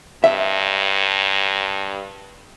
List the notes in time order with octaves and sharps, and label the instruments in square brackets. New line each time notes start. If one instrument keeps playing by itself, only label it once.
[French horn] G2 [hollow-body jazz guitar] E5